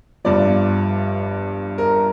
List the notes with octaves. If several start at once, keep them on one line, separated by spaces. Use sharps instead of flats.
G1 G2 F3 D5
A#4